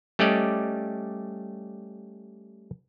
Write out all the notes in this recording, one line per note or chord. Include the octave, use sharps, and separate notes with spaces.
G3 A3 C#4 G4 D5 D#5